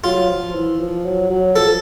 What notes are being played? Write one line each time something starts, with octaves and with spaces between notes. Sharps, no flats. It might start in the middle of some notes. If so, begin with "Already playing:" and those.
F#3 F4
F3
E3
F3
F#3
F#3
F3 A4